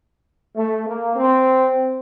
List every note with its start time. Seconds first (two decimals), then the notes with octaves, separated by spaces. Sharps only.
0.56 A3
0.86 A#3
1.16 C4